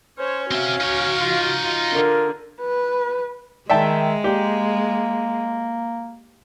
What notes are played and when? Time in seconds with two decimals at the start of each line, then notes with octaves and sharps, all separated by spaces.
0.19 C#4 C5 C#5
0.51 C4 F#4 E5 F5
0.81 D#4 C#5
1.20 F4
1.64 F4
1.93 D3 A#4
2.61 B4
3.70 D#3 G#3 E5 G5 A5
4.24 A#3 G4